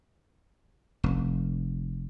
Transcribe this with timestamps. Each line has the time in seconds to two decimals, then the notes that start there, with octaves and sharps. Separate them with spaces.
1.04 F1